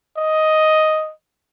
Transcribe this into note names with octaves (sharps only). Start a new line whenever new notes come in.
D#5